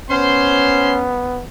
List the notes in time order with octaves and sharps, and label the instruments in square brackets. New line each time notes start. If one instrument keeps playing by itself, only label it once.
[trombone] B3 [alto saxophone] C#4 [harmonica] C5 C6